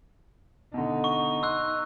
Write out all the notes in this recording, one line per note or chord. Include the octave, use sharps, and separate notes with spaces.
B2 D3 D#4
C#6
C6 E6 F#6